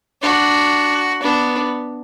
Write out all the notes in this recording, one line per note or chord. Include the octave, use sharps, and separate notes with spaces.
D4 F#4
B3 D4